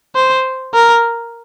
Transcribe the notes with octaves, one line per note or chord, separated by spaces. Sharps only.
C5
A#4